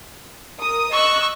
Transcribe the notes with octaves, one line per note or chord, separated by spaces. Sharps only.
A#4 D#6
D#5 C#6 E6 F#6